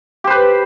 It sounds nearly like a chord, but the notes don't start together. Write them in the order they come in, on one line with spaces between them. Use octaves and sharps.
G4 C5 B4